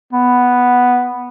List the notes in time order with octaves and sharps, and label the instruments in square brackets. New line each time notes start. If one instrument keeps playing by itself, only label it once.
[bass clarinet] B3